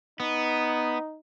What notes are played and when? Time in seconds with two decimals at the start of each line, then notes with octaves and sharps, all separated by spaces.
0.20 B3 D#4